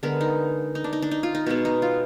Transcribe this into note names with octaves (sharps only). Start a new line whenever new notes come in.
D3 G#3 B3 A#4
D#4
D#4
D4
D#4
D4
D#4
F4
D#4
B2 G#3 B3 D#4
D#4
F4